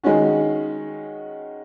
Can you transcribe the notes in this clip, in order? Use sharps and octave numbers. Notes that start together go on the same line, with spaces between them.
D#3 G#3 C#4 F#4